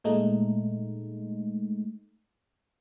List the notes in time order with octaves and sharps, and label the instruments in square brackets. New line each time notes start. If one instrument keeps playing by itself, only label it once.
[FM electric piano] A#2 G#3 A3 D#4